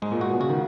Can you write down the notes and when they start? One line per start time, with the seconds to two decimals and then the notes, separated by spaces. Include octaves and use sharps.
0.02 G#2 G#3
0.12 A#2
0.21 F#4
0.30 B2
0.40 C#3 F#4
0.49 D#3